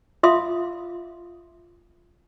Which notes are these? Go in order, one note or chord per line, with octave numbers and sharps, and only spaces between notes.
F4 E5 F5 C6 D#6